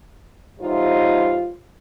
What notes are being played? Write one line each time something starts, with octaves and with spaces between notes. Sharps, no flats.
E2 A2 G3 D#4 F4 C5